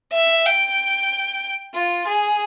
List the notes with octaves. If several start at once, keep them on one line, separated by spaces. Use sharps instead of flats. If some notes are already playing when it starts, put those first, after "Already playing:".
E5
G5
F4
G#4